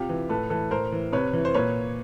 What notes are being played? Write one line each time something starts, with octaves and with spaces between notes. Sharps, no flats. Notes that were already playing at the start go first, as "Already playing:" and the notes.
Already playing: C3 F4 G4
E3
A2 A4 B4
E3 A4 B4
A2 A#4 C5
E3
C3 B4 C#5
E3
C5
A#2 B4 C#5